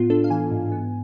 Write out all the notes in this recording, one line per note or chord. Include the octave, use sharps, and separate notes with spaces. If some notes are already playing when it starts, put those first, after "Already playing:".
Already playing: A2 B3 F4
D4 A4
F5
E3 G#5
G#2
B3